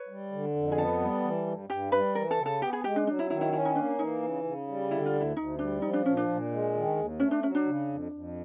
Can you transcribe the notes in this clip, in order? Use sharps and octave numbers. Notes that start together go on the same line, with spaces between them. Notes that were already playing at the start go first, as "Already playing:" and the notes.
Already playing: B4 C#5
G3
D3
F2
G#4
B3 A4
G3
E3
G2
G2 G4
G3 B4
E3 A#4
A4
C#3
A4
B3 G4
G#4
G#3 G4
D4
F#3 D4
E4
D#3 E4
E4
C#4 E4
D#4
A#3 D4
E3 D#4
C#3
C#3
G3
D3 E4
F4
D2
E4
D2 D#4
G3 D4
F3 D#4
D4
A#2 C#4
D4
A#2
G#3
D#3
D#2
A3 C#4
D4
F#3 C#4
D4
C#3
F2
F2